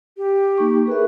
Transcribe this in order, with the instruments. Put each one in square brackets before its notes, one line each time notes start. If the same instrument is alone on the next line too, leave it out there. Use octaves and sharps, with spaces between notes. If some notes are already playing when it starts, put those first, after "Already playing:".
[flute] G4
[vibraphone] A#3 D#4 C#6
[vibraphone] G#4 A#4 E5 [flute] B4